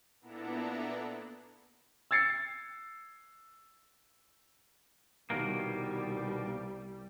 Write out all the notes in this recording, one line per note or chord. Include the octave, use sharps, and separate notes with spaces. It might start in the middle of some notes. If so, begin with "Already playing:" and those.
A#2 B3 D4 E4 A4 A#5
E6 G#6 A6 C7 C#7
C2 B2 D#3 G3 A#3